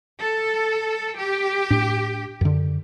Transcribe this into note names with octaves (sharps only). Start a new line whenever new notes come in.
A4
G4
A2 D4
F#2 D3